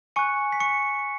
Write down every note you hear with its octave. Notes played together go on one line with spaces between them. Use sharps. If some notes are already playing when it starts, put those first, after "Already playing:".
G#5 C#6 F#6 C#7
B6
C#6 C#7